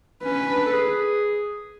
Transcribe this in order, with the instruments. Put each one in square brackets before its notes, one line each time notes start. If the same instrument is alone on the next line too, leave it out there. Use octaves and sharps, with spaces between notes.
[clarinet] C#4 [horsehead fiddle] B4
[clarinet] D4
A4
G#4